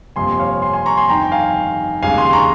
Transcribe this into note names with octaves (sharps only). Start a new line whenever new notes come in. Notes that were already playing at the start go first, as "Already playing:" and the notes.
G1 F2 C3 F3 A#3 G#5 C6
C#5 F5
G#5 C6
G#5 C6
A#5 C#6
G#5 C6
G1 F2 D#3 G5 A#5
G5
F5 G#5
F1 D#2 C#3 G#3 F5 G#5
G#5 C6
A#5 C#6